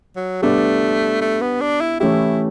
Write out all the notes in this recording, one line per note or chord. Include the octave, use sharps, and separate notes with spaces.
F#3
G3 A3 B3 D4
A3
B3
D4
E4
E3 A3 C#4 E4 G4